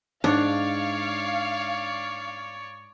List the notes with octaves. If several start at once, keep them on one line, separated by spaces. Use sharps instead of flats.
G#2 D4 C#5 D5 F5